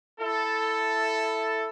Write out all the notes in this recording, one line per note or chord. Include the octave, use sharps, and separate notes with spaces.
E4 A4